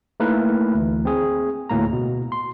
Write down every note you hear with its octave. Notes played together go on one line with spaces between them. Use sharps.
A3 A#3 D#4 E4 A#4 B4
D2 E3
C4 G#4
D2 A2 A#3 A#5
B2
C6